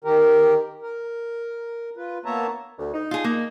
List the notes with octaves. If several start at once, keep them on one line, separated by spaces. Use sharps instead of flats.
D#3 G4 A#4
A#4
F4 B4
A#3 B3 C#5 E5 A5 A#5
D2
D#4
F4 G#4
A#3